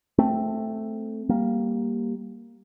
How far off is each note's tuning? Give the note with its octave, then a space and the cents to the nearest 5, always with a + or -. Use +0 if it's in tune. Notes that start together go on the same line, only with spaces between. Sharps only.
A3 +0 C4 +0
G3 +0 A#3 +0